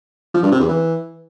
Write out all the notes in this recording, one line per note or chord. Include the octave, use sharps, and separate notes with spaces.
F3
G2
C3
E2
E3